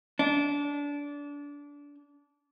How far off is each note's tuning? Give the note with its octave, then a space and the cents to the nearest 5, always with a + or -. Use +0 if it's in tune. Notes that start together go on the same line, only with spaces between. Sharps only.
D4 -25